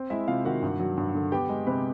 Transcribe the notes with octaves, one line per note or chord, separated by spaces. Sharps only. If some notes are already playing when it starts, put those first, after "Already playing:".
Already playing: C4
G#3 E4 E5
C3 F4 F5
D#3 F#4 F#5
G2
F#3
G2
D3
B3 G4 G5
G#3
C3 B4 B5